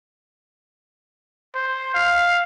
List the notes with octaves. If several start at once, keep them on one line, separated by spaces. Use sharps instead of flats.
C5
F5